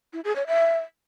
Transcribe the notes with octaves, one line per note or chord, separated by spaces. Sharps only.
E4
G#4
C#5
E5